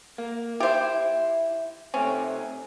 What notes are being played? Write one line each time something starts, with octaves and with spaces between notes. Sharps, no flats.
A#3
E4 G4 C5 E5
C3 A3 C4 C#4